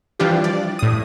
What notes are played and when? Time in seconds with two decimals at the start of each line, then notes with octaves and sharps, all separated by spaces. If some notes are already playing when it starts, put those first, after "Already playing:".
0.20 E3 F3 G3 D4 F4 G4
0.44 D5
0.79 A2 D#6